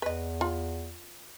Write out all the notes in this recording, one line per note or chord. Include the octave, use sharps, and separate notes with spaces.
E2 B4 D#5
F4